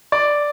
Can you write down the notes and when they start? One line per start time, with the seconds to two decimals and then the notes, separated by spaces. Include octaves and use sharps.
0.12 D5